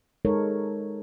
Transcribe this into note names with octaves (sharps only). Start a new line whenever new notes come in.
G#3 D#4 A4 A#4 C#5